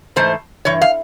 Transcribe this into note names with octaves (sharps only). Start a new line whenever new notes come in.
G#2 E3 A3 C5
G2 E3 C#5
F5